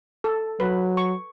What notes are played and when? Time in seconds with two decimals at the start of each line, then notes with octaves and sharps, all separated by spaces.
0.24 A4
0.60 F#3 B4
0.97 C#6